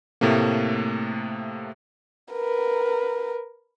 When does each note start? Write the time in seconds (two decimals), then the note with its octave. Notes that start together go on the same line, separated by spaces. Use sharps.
0.21 A2 C3 A3 A#3
2.33 A#4 B4